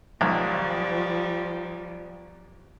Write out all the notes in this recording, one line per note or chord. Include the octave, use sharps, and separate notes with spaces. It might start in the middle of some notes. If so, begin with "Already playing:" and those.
B1 G#2 D#3 F3 G3